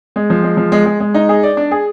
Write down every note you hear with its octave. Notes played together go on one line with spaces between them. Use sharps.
G#3
F3
G#3
F3
G#3
G#3
G#3
D#4
G#4
D5
D4
G#4